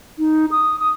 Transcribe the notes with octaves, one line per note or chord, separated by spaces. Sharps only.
D#4
D#6
D#6